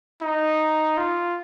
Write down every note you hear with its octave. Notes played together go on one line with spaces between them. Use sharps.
D#4
F4